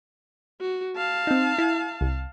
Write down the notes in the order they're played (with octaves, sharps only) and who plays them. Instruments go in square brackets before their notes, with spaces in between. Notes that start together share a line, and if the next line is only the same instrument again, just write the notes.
[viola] F#4
F5 A5
[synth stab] C4 D#4
E4
C2